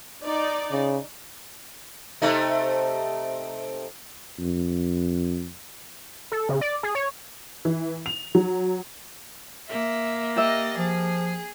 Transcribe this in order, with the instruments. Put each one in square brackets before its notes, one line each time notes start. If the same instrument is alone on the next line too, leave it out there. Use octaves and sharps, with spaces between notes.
[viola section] D#4 D5
[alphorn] C#3
[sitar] C3 A3 D#4
[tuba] F2
[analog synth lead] A4
C#3
D5
G#4
C#5
[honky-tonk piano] E3
F7
F#3
[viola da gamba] A#3 [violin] E5
[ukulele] G4 E5 [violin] D#5 A6
[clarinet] F3 [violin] G#4